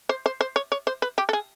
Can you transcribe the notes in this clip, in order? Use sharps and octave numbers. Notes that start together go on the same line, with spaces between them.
C5
C5
C5
C#5
C#5
C5
B4
G4
A4
G#4